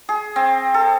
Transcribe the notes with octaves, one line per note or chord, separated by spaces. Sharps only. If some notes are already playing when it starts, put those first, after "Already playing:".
G#4
C4
A4